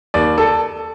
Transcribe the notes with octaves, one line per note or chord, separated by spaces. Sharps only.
D#2 D5
A4